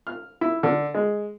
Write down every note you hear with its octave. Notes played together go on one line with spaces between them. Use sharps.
F6
E4
D3
G#3